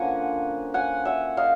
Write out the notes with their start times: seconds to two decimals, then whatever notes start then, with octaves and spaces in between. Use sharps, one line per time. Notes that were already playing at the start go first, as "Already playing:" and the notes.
Already playing: D3 F3 A#3 C#4 F#5 G#5
0.74 F#5 G#5
1.05 E5 F#5
1.37 D#5 F5